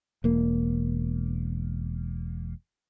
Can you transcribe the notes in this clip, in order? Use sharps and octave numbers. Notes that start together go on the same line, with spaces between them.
E1 A#3